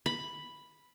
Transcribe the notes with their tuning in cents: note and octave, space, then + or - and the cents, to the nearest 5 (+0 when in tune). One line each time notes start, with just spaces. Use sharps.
B5 +0